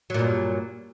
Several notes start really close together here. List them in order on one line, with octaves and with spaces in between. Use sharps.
F#3 A#2 G2